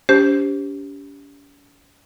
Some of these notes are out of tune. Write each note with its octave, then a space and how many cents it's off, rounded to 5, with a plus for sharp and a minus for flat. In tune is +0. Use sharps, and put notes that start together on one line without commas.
C#4 +45 G4 +0 C5 +0